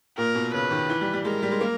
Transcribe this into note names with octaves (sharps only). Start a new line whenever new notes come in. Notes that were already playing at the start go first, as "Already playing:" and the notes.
A#2 A#4
B2
C#3 B4
D#3
E3
G3
G3
G#3 A#4
G3
G#3
A#3